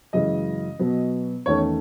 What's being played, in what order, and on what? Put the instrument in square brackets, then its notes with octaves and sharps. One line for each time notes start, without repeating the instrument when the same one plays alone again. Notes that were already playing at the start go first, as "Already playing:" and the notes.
[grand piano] F#2 C#3 E3 G#3 D#5
B2 F#3 B3
E2 D#3 A3 C#4 C#5